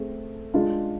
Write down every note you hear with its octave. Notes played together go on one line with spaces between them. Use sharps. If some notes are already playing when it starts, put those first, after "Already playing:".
Already playing: A3 C4 G#4
G#3 D4 F4